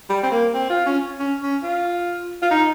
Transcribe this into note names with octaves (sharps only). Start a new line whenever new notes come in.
G3
C4
A#3
C4
F4
C#4
C#4
C#4
F4
F4
D#4